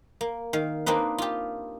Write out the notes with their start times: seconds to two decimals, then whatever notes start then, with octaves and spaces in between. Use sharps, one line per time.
0.21 A#3
0.53 D#3 F5
0.86 A#3 C4 D4 D#4 B4
1.18 F4 G4